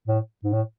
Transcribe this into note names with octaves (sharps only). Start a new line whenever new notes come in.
A2
G#2
A2